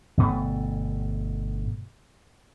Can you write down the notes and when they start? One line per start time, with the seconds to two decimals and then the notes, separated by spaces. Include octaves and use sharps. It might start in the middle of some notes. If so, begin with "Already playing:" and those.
0.17 G1 B2 A3